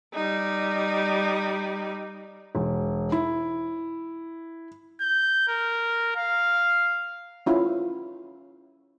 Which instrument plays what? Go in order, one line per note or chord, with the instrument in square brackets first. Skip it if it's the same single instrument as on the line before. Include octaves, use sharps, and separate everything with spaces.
[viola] G3 D#4
[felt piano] E1
E4
[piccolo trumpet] G6
A#4
F5
[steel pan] C#4 E4 F4